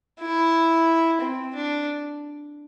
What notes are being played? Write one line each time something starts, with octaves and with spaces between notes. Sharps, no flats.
E4
C4
D4